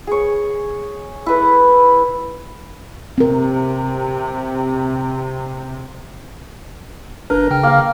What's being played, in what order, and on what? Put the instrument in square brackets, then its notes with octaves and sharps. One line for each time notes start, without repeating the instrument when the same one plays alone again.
[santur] G#4 C#5
E4 A4 B4
[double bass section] C3 [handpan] C4 A#4
[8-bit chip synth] G1 D4 B4 [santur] A#4
[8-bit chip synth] C#3 G5 F6
[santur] A#3 F5